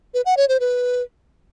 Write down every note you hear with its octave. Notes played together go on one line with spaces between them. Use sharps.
B4
F#5
C#5
C5
B4